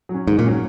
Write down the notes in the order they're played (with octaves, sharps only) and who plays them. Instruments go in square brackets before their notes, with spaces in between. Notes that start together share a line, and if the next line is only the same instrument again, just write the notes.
[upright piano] F#3
C#4
[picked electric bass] G#2 [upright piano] D#3
[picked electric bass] A#2
[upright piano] F#3 C#4